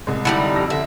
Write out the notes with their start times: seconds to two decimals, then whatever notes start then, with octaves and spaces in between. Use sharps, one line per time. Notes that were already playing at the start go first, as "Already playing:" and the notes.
0.07 C2 G#3
0.25 D3 G3 D#4 E4
0.56 F2 E6 A#6
0.70 D3 E5